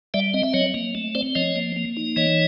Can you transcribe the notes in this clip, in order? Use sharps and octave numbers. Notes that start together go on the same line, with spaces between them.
G3 D5 E5
C4 D#5
E5
F#3 C#5 D#5
A#3
A3
C4 C5 D5
F3 C#5 D#5
A#3
A#3
D#4
E3 C#5 D#5